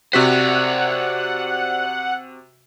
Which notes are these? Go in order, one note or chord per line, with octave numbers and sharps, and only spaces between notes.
C3 F#4 C5 D5 F#5 B6